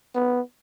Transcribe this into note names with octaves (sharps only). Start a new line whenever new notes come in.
B3